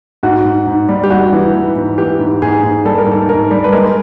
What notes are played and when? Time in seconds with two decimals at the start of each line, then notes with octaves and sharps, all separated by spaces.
0.23 G#2 F#4
0.45 G#2
0.67 G#2
0.89 G3
1.04 G4
1.10 G3 F#4
1.32 E3
1.54 E3
1.75 G#2
1.98 E3 G4
2.19 G#2
2.42 G#2 G#4
2.63 G#2
2.85 G3 A4
2.98 A#4
3.06 G#2
3.12 A4
3.29 G#2 A#4
3.51 G3
3.64 B4
3.72 G#3 A#4